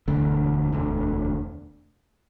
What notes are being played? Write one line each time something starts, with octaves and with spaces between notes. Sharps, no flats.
E1 D2 D3
E1 D2 D3